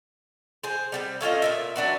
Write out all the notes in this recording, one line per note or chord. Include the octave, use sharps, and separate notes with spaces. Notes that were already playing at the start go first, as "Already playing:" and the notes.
G#4 C5
G3 B3 C4
A3 C#4 F4 D#5
A#2 E3 E5
F#3 D4 F#4 B4